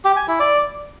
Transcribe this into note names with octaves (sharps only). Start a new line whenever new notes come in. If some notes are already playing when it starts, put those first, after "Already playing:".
G4
G#5
E4
D5